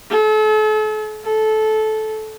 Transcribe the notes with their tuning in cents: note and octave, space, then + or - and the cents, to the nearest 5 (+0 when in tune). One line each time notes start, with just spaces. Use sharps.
A4 -40
A4 -15